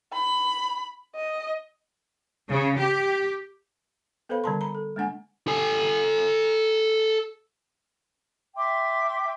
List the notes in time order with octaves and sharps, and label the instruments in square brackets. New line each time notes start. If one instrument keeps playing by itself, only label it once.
[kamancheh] B5
D#5
[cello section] C#3
G4
[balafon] B3 A4 B4 C5 F5 B5
D3 G3 D5 A5 A#5 C6
A#5 B5
A4
G#3 A#3 D4 F#5 G#5
[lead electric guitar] A4 G#5
[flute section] E5 G5 C6 D6